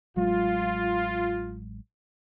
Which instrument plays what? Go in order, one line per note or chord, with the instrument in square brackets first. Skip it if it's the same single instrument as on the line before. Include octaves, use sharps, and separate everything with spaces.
[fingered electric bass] A1 F#3 G#3 [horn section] F4